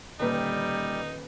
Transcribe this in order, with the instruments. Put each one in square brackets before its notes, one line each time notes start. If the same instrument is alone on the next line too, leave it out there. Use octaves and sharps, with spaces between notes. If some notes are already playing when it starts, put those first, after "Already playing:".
[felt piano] D#1 B4 [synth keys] D3 A#3 [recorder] G3 [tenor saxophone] D#4